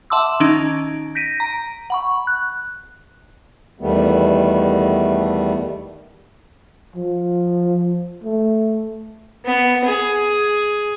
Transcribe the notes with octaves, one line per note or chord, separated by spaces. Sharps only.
E5 F#5 A5 C6 D6 E6
D#3 C#4 D#4 D7
G6 A#6 B6 D7 D#7
A#5
F#5 B5 C#6
F#6
E2 D#3 G3 A3 B3
F3
A3
B3
G#4